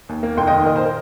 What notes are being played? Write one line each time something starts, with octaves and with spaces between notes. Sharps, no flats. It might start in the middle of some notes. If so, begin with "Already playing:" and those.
D#2
A#3
F1 G5 C6
D#5 G5
D#3
A#2 A#4 D#5
C5
A#4